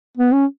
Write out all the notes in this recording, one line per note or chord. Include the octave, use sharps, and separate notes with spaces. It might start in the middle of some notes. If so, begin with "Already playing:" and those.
B3
C#4